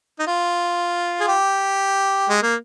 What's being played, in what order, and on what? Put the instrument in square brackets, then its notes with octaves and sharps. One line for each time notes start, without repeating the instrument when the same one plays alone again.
[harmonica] D#4
F4
G#4
G4
G#3
A#3